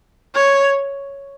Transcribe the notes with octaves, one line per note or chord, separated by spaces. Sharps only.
C#5